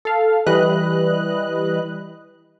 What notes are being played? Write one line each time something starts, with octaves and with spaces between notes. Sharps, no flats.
A4 F5
E3 G3 B4 D#5 F#6